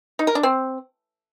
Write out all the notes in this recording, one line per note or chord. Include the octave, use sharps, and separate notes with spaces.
D#4
A#4
D4
C4